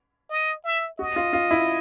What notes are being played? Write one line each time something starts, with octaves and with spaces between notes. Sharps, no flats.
D#5
E5
F#4 D#5
F4
F4
E4